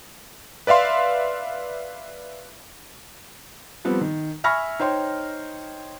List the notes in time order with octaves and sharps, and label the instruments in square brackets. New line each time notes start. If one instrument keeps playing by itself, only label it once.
[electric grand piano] B4 D5 E5 F5 C6
[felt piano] F3 G3 B3 C4
D#3
E5 G#5 B5 C#6 F6 A#6
D#4 C5 C#5 G5 C6